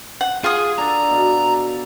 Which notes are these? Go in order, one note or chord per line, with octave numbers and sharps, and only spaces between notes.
F#5
F4 G#4 D#6
D4 A4 A#5
B2